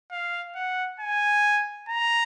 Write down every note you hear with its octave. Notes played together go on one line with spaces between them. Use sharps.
F5
F#5
G#5
A#5